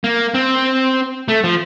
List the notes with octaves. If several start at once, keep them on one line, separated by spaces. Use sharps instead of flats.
A#3
C4
A3
F3